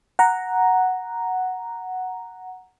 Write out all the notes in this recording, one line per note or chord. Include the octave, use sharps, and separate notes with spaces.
F#5 A#5